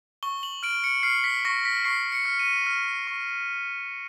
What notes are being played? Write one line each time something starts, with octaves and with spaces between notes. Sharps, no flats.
C#6 G7
F#7
F6 D7
C#7
F6 C7
B6
C#6 A#6
B6
C#6 C7
C#7
F6
D#7
F6
C#6